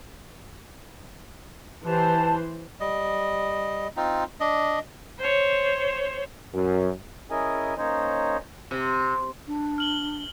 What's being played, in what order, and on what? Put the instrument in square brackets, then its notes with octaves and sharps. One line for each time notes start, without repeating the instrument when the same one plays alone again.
[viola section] E3 C5 [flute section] G4 A5
[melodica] G3 D#5
C4 D#4 F4
D4 D#5
[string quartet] C5 C#5
[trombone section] F#2
[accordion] C#4 E4 G#4 A#4 D#5 G#5
A#3 C#4 D#4 C5 C#5 D#5
[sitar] C3
[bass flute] D4
[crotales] F6 F#7 G7